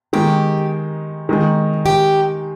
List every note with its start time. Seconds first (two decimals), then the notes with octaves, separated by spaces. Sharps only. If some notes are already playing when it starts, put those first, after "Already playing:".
0.13 D#3 G#3 D#4 G4
1.29 D#3 G#3 D#4
1.86 G4